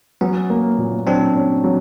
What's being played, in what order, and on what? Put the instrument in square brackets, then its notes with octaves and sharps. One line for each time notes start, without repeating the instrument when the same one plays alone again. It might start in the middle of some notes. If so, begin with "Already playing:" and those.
[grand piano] F#3 [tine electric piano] B3 C#4
[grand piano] A#3
A#2
[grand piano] F#3 [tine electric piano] C4 D4
[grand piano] C#4
F#3